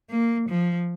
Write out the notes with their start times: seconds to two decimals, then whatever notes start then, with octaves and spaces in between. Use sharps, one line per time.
0.10 A#3
0.49 F3